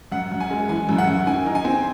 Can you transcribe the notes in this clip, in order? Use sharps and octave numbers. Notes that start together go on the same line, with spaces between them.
F#2 F#5
F#2
G#5
G#3
E3 G#5
F#2
F#5
F#2
D#3 G#5
D#4
G#5
C4